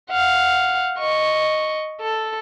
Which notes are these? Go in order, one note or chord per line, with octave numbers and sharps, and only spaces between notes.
F5 F#5
D#5 C#6
A4